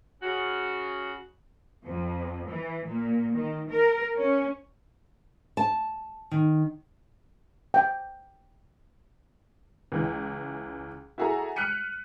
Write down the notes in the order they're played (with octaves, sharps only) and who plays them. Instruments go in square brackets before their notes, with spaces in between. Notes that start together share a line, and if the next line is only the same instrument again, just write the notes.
[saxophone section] C#3 F#4
[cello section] F2
E3
A#2
D#3
A#4
C#4
[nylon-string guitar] A5
D#3
[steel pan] G5
[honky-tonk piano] C#2 E3
E4 F#4 G#4 A4 A#5
F6 F#6 B6 C#7 D#7